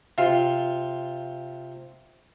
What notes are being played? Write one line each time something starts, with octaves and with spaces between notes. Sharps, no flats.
C3 F4